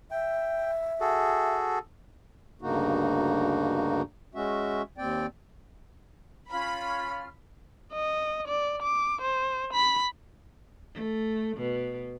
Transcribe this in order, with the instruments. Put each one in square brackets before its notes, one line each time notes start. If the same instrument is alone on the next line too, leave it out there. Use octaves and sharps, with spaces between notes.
[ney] E5 [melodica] G5
[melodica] F#4 G#4 A4
[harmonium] D2 G2 C#3 A#3 D#4 F#4
G#3 C#4 F#4 E5
D#2 C4 D5 G5
[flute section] C#4 F4 F6 [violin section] B5
[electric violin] D#5
D5
D6
C5
B5 B6
[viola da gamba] A3
B2